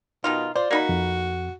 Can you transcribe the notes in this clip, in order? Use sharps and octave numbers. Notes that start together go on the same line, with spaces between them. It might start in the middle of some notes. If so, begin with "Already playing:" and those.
B2 D#3 D#4 F4
F4 C5 D5
A#3 D#4 F#4 B5
F2